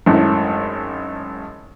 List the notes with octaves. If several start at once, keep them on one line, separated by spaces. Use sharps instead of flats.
G#1 F#2 A2